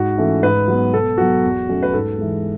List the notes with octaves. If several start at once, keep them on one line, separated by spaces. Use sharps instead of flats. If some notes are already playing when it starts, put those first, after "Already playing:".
Already playing: G#2 F#4
E3 A3 C#4
G#2 B4
F#3 B3
B2 A4
F#3 B3 F#4
E2
B2 F#3 A3 C#4
B4
G#2 A4
E3 G#3